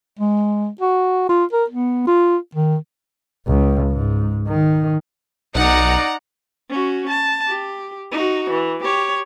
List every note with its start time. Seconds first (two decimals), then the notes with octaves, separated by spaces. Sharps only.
0.19 G#3
0.81 F#4
1.29 F4
1.53 A#4
1.70 B3
2.07 F4
2.55 D#3
3.47 C#2
3.90 G#2
4.48 D#3
5.55 B1 D#4 D5 F#5 A#5
6.70 C#4 F#4
7.09 A5
7.47 G4
8.12 D#4 F#4
8.51 E3
8.84 G4 C#5